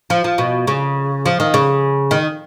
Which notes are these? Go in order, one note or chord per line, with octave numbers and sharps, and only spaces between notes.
F3
F3
B2
C#3
F3
D#3
C#3
D#3